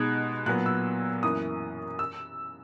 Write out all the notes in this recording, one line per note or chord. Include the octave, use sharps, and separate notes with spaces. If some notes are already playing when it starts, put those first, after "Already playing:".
Already playing: B2 G#3 D#4 F#6 G#6
A#2 F#3 B3 F#6
E6
F#2 E3 A#3 D#6
E6